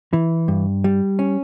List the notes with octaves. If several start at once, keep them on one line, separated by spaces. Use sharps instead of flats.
E3
G2
G3
C#4